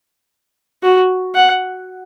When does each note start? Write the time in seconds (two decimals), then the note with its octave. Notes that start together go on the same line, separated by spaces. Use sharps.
0.83 F#4
1.35 F#5